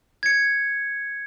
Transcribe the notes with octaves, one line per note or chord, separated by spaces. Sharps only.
G#6 C#7